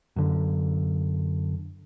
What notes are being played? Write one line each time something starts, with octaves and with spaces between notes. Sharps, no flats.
F#2 D3